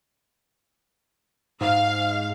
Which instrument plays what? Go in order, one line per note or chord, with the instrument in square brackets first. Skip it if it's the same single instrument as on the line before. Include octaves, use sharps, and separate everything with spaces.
[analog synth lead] G#2 [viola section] F5